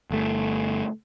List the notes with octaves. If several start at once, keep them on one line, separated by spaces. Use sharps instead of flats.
G1 A3